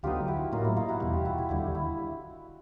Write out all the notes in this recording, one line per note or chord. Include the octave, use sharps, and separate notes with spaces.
D2 D3 F#3 B3 D#4 F4 G4
E4 F#4
A2 F#3 A#3 D#4 F4
E4
D#4 F4
E4 F#4
E2 B2 G3
F4 G4
E4 F#4
E4
D#2 D3 G3 E4
E4